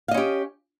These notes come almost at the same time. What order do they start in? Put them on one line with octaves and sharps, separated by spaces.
F5 D#5 C#4 G4